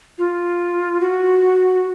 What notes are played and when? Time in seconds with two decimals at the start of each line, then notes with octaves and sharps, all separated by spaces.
0.18 F4
1.01 F#4